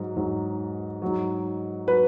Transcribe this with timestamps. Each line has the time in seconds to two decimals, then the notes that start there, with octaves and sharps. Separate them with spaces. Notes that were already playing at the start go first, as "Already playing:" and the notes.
Already playing: G#2 F#3
0.16 G#2 F#3
1.02 G#2 F#3
1.87 F#3 B4